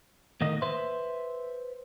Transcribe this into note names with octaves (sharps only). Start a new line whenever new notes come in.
A2 D#3 A#3 D#5
B4 C5 E5 C6